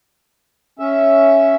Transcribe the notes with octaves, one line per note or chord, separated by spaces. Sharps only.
C#4 E5